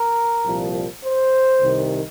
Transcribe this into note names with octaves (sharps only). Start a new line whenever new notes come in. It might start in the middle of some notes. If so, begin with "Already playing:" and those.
Already playing: A#4
C2 A#2 F3
C5
C2 C3 D#3